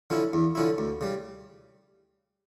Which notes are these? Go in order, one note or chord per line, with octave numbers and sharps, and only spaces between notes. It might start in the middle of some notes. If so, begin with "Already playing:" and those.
D3 F3 C#4 E4
E2
D3 F3 C#4 E4
D2
C#3 G3